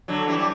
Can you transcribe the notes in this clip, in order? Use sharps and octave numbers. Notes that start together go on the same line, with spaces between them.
D3 F#3
E3 G3
G3